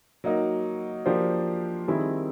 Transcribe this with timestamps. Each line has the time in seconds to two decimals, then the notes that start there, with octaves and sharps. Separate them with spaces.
0.24 F#3 A#3 D#4 F#4
1.05 F3 A#3 D4 G4 C5
1.88 D#3 G3 C4 E4 G#4